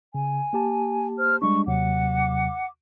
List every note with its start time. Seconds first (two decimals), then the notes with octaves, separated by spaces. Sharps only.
0.15 C#3 G#5
0.53 A#3 G4 A5
1.18 C5 F6
1.42 G3 G#3 D4 C#6
1.67 D#2 C3 F#3 F#5 D6